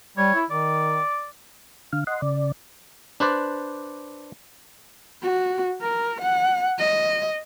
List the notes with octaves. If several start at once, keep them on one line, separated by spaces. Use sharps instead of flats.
G3 C#5
E4
D#3 D5
D3 F5
D#5 F#5 C6
C#3 D5
D4 B4 C5 D5
F#4
A#4
F#5
D#5